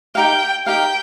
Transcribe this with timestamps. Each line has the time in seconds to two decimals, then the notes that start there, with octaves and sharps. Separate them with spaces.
0.15 D#4 G4 A#4 F5 G5
0.66 D#4 G4 A#4 F5 G5